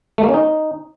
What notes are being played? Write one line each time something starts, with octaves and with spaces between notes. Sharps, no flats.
A3
A#3
C#4
D#4